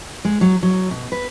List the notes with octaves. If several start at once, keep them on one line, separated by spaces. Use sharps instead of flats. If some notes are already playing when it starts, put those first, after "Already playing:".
G#3
F#3
F#3
B2
B4